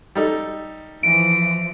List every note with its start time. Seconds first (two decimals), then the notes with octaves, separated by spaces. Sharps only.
0.15 G3 D#4 A4
1.03 E3 F3 D7